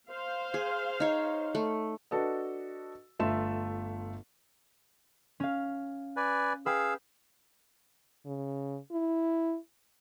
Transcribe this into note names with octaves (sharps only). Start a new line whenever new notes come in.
C5 F5
G#4
D#4 C#5
A3
D4 F#4 A4 B4 D#5
G1 A3 F4 E5 E7
C#4 F5
B4 D5 G#5
G#4 B4 F5 G5 E6
C#3
E4